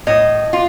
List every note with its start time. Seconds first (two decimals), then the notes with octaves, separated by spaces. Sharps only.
0.07 A2 D#5
0.53 F4